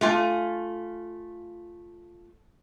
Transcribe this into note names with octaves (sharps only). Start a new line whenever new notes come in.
A3 F4 G#5